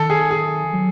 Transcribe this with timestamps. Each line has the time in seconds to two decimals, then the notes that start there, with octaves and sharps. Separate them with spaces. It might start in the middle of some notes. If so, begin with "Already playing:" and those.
Already playing: D#3 A4
0.10 G#4
0.31 G#4
0.73 F#3